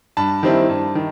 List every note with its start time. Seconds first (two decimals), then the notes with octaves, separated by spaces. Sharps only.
0.17 G2 A5 B5
0.43 D#3 G3 C4 E4
0.69 G2
0.95 D#3